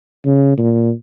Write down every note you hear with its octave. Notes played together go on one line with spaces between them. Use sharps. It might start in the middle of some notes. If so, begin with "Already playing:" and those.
C#3
A#2